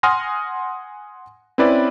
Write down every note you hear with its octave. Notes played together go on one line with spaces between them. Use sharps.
F#5 G#5 C6 D#6 F6 A#6
C4 C#4 E4 B4 D5